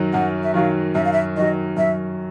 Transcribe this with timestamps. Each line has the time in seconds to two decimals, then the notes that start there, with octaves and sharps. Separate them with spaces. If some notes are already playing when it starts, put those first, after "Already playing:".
Already playing: F#2 D#3 F#3
0.13 F#2 F#5
0.43 E5
0.54 D#3 F#3 F5
0.95 F#2 E5
1.05 F5
1.13 E5
1.37 D#3 F#3 D#5
1.77 F#2 E5